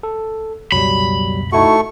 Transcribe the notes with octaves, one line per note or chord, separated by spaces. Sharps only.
A4
C#2 F#2 B2 F#3 G3 B5
A3 D#4 E4 F#4 C#6